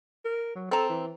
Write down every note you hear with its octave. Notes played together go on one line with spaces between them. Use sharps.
A#4
F#3
C4 A4 A#5
E3